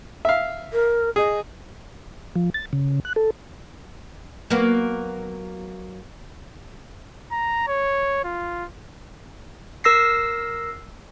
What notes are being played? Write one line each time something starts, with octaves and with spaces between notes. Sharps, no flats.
E5 F5
A#4
G#4 D#5
F3
A6
C#3
F#6
A4
F#3 A#3 B3
A#5
C#5
F4
A#4 E6 A#6 C7